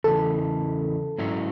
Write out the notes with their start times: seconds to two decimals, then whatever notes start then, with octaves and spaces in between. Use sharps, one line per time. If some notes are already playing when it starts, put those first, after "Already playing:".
0.04 E2 C#3 E3 A4
1.18 G#2 F#3 C#4 E4